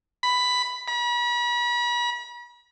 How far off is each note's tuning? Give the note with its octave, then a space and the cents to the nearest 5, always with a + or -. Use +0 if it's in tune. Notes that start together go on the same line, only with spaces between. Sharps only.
B5 +10
B5 -40